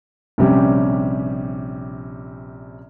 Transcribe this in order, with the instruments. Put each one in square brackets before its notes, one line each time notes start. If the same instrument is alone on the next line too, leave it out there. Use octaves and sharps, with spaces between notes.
[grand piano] A#1 C3 G3 C#4 G4